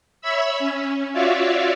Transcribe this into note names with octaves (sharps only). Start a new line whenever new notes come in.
C#5 E5 B5 E6
C#4
F4 F#4 C#5 D5 E5 F5